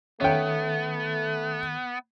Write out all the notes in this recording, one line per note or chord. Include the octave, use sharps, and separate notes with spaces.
D#3 A3 B3 C#4 A4 E5 G5